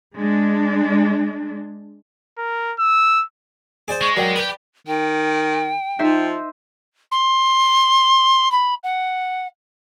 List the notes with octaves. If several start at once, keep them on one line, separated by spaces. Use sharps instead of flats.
G#3 D4
A#4
E6
G#4 C5 D5 D6
G#3 C#6
F#3 A#4 D5 G5
G4 G#4 B4
D#3 G5
F3 D#4 C5 E5
C6
B5
F#5